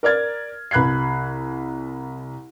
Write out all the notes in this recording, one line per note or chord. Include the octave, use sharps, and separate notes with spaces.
A#4 D5 F6 G#6 A6
C2 B5 F#6 G#6 C7